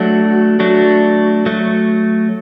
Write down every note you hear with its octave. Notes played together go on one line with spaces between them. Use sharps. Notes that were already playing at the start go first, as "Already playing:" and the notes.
Already playing: F#3 A3 D4 F#4
F#3 A3 D4 F#4
F#3 A3